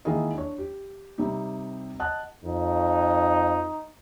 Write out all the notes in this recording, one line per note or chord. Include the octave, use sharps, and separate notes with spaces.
D#3 G#3 A#3 E4 G#4 D#5
D4 C#5
G4
C3 G3 C4 D#4 G4
D#5 F#5 A5 F#6
F2 D#4